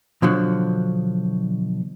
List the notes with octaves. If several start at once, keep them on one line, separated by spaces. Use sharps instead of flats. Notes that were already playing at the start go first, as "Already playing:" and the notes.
B2 D3 F3 F#3